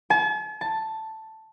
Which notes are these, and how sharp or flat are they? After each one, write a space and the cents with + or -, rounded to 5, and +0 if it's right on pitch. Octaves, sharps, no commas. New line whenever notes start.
A5 -45
A5 +5